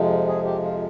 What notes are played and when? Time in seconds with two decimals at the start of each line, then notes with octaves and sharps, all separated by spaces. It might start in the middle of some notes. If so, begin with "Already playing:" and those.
Already playing: F2 C3 F3 G#3
0.28 G#4
0.45 G4
0.62 F4